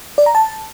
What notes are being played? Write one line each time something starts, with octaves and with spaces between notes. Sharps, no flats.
D5
A#5
A5